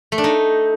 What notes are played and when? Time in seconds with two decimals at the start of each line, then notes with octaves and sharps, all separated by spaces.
0.12 A3
0.18 D4
0.24 D#4